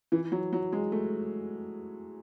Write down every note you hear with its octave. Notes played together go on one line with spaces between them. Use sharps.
E3
F#3
F#3
G#3
A3